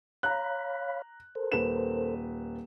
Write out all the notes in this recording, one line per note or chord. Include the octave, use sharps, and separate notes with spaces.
C#5 F5 A#5 B5 F#6
A4 A#4 C5
D#1 B4 E7